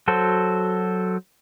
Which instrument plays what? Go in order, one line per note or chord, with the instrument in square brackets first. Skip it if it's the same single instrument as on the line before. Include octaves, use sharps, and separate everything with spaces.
[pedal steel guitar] F#3 F#4 A4 C5